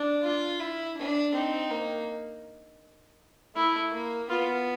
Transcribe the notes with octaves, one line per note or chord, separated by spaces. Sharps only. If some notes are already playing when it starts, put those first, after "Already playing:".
Already playing: D4
F4
E4
D4
C4 D#4
A#3
A3 E4
A#3
B3 F4